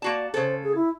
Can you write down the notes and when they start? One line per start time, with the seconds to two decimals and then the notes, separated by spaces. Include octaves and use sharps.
0.02 A#3 F#4 D5 A5
0.34 C#3 A4 C5
0.64 G#4
0.75 E4